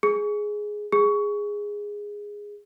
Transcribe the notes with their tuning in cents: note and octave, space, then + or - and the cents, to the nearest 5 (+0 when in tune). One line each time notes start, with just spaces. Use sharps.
G#4 +5
G#4 -10